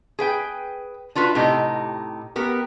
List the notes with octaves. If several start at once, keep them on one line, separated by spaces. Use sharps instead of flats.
G#4 B4 G5
D4 F4 F#4 B4
A2 C3 D#4 G4
B3 G4 A#4